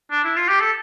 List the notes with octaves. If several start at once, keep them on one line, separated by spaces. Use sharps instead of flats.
D4
E4
F4
G4
A4